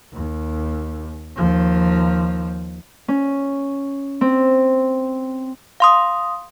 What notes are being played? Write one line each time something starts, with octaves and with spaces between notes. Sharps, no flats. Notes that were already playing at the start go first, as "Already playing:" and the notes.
D#2
D#2 F3
C#4
C4
F5 C6 D#6